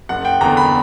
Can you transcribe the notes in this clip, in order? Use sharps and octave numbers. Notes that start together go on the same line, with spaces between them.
F#1 F#5
G5
E2 D3 A#5
B5